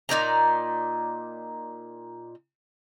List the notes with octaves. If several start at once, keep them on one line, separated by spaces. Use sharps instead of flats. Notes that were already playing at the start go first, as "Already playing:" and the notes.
A#2 D#4 D5 A#5